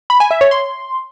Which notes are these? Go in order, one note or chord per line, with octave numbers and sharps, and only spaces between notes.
B5
G#5
E5
C#5
C6